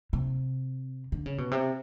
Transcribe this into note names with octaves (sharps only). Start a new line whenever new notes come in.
C3
D3
C#3
B2
C3